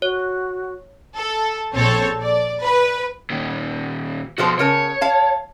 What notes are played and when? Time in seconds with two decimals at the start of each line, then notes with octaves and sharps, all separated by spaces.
0.02 F#4 C#5
1.16 A4
1.75 A#1 C4 A4 C#5
2.22 D5
2.63 B4
3.30 A#2 D#3
4.38 B2 F3 F#4 A4 C5
4.59 C#3 A#4 C#5 A5
5.01 F5 A5